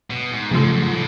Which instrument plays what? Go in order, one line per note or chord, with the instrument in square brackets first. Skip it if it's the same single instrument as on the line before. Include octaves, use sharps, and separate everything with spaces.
[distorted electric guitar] B2
G#2
[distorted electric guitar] A2 [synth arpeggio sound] C#3 F3 A3 F4 A4
[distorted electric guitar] G#2
F#2
G#2
A2